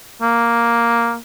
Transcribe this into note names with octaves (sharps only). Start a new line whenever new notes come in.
A#3